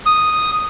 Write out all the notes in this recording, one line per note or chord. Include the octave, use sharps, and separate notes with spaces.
D#6